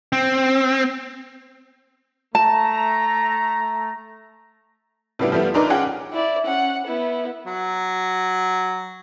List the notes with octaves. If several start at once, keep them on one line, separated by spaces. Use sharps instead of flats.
C4
A3 A5 A#5
A2 C#3 G3 B3 D4 E4
F3 G3 A3 B3 E4
A#1 D4 D#4 A#4 B4 D6
C#4 F4 G#4 F#5 G5
E4 D5
C#4 F#5
B3 E4
F#3